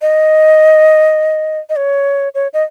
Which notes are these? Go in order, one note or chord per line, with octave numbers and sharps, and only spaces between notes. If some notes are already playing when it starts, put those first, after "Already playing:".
D#5
D#5
C#5
C#5
D#5